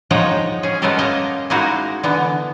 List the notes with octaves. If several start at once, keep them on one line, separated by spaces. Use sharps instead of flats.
F3 G#3 D#4 C#5 F#5 G5
C#4 G#4
G#3 A3 B3 C#4 A4 A#4
A#3 D#5 G#5 A#5
G#3 A#3 D#4 E4 F#4
D3 E3 B3